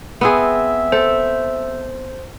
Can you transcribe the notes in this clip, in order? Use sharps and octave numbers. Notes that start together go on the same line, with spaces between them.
B3 C4 G#4 E5
A4 C5